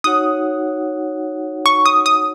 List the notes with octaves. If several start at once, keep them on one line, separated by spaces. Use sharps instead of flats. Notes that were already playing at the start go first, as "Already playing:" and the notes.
D#4 F#4 C#5 F#5 D#6
C#6
D#6
D#6